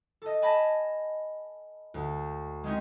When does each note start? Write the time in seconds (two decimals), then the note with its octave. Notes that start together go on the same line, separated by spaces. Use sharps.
0.22 A4 D#5
0.42 G#5 A5 B5 A#6
1.94 D2
2.64 G#3 C4 C#4 D#4